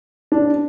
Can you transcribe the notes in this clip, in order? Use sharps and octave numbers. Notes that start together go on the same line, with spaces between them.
D4